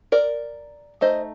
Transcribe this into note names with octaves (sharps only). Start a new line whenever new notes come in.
A#4 D5
A3 D#4 C5 D#5